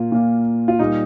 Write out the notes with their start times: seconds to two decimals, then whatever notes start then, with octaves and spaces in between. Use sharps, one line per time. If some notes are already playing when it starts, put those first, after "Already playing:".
Already playing: A#2 A#3 F4
0.12 A#2 A#3
0.68 F4
0.79 A#2 G3 A#3 D#4